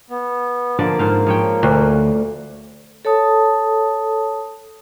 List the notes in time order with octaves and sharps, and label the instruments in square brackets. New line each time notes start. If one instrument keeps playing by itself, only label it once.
[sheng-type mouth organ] B3
[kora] D3 F3 D5 [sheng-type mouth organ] A#3
[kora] G#2 C5 F5
F3 C#5 G5
[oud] D2
[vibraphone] A4 C#5 A5 D#6